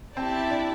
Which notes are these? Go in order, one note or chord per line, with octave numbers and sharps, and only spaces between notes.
C4 E4 G4 D5 A5
D4